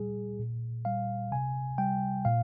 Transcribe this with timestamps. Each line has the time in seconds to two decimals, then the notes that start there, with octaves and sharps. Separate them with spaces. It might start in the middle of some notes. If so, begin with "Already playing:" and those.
Already playing: A#2 G3 G#4
0.39 A#2
0.85 G3 F5
1.32 C3 G#5
1.78 G3 G5
2.25 A#2 F5